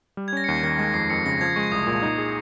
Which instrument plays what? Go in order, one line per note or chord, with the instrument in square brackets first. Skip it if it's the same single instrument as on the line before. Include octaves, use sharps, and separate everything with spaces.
[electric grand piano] G3
[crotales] G#6
[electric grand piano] C#4 [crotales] A#6
[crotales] C#7
[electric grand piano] D#2 [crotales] C7
[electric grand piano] D#3 [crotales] A#6
[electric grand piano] G#3 [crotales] A#6
[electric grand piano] F2 [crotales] C7
[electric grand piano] F2 [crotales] C#7
[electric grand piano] C#3 [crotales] A#6
[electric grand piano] F3 [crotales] G#6
[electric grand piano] G#3 [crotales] C#6
[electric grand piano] C2 [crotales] D#6
[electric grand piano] A#2
D#4
G#4